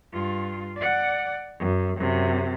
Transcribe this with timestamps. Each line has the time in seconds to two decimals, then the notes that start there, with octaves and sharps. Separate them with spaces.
0.12 G2 F4
0.77 D5 F#5
1.60 F#2
1.98 F#2 C3